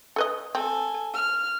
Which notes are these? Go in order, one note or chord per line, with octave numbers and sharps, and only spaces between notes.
A4 B4 D#5
C4 A4 G#5
F6